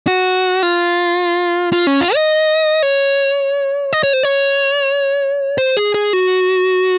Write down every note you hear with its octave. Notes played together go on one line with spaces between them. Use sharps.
F#4
F4
F4
C#4
F4
D#5
C#5
D#5
C#5
C5
C#5
C5
G#4
G#4
F#4